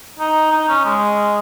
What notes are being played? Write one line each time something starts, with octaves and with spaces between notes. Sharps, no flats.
D#4
D#4
C#4
G#3